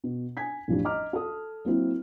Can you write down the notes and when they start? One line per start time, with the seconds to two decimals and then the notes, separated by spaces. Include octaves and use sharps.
0.04 B2
0.37 G#5 G#6 B6
0.68 A1 F2 F3 G3 D4
0.84 D#5 A#5 D6 F6
1.13 A4 D#6
1.65 F#3 A#3 C4 E4